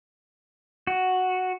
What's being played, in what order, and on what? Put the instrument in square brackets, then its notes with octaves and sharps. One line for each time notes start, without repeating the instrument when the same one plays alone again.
[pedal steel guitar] F#4